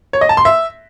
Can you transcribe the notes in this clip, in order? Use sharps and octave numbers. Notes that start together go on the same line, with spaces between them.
C#5
D#5
A5
C6
E5